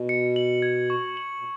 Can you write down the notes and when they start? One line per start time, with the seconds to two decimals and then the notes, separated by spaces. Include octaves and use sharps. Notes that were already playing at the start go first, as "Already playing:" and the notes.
Already playing: B2
0.09 C#7
0.36 F#7
0.62 G#6
0.90 C#6
1.17 F#7
1.39 B2